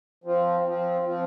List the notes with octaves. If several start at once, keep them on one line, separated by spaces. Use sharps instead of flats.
F3 C4 F4
F3 C4 F4
F3 C4 F4